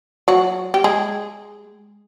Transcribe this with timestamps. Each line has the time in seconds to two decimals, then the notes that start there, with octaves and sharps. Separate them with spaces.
0.28 F#3 F#4
0.74 G4
0.84 G#3 G#4